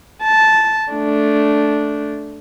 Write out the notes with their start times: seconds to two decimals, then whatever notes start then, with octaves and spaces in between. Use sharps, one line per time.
0.23 A5
0.92 A3 D4